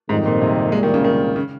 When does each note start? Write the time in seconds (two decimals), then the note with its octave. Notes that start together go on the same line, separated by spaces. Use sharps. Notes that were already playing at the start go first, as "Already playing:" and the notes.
0.09 F2 G#2 D#3 G3 C4 D#4
0.26 A#2
0.41 C3
0.72 C2 A#2 G3 G#3 A#3
0.83 D#3
0.94 C#3
1.04 D#3
1.36 C#3